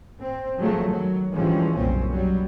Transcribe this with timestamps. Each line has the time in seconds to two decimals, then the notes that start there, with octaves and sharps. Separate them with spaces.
0.21 C4
0.57 F3 F#3 G#3 A3
0.89 D#3 F#3
1.32 D3 E3 F3 G3 G#3 C#4
1.75 F#1 B1 A#2 G3 C4 C#4
2.08 F#3 G3